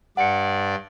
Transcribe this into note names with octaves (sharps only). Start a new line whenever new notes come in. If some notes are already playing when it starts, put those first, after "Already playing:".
G2 D5 F#5 C#7